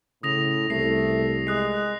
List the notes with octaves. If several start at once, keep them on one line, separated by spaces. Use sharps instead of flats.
A2 C#3 D#6 A#6 F7
C2 A3 C7 F7
G#3 D#6 F#6 C7